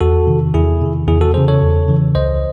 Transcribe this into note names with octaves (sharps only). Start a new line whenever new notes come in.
E2 F#4 A4
C3 D#3
E2 E4 G#4
C3 D#3
E2 E4 G#4
F#4 A4
C#3 E3 G#4 C5
A4 C#5
E2
C#3 E3
C#2 C5 D#5